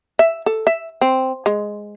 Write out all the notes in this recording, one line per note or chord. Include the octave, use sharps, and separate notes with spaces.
E5
A4
E5
C4
G#3